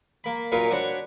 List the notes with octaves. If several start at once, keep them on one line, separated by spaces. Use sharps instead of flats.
A#3 B5
F#2 A#2 C#4 A#4 B4 F5
D4 F#4 C5 C#5 B5